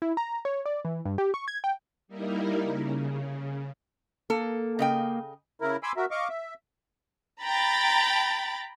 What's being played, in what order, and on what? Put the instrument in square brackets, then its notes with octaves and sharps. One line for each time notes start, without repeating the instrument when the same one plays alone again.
[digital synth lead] E4
A#5
C#5
D5
E3
G2
G4
C#6
G#6
G5
[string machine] G3 A#3 D#4 E4 A#4
C#3
[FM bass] A#3 [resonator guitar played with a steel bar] A4
[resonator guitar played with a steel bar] C#3 D#5 G5
[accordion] C#3 E4 A#4
G#5 B5 C6 D6 E6
F#4 A#4 E5
D#5 F5 C#6 D6
E5
[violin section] G5 A#5 B5 A6